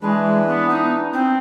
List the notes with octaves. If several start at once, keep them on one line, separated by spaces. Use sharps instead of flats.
E3 G#3 D4 B4
B3
D#4
C4